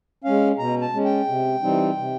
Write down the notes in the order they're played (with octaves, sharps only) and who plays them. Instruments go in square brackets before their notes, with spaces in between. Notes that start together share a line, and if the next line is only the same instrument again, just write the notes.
[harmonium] G#3 C#4 F5
B2 A#5
A5
G#3 C#4
G5
C3
E3 G3 C4 D#4
C3